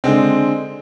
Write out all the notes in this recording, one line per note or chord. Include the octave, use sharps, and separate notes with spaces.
D3 G#3 C4